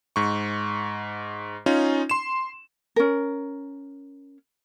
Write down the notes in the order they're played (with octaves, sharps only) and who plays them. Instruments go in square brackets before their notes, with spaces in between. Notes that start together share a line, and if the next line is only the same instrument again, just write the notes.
[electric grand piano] G#2 C#6
C#4 D#4 F4
C6 E7
[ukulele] C#4 A#4